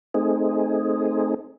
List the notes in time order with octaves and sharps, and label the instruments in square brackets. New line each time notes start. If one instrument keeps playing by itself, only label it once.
[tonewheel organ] A3 C4 D#4 G#4